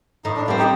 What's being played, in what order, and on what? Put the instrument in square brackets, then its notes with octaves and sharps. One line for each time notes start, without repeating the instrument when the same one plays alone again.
[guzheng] A2 [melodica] D#4
[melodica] D4
[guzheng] G3 C4 [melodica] A#3
[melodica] D#4 G4